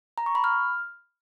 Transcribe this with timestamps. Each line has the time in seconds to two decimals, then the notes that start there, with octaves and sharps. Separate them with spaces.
0.18 A#5
0.26 C#6
0.35 B5
0.44 F6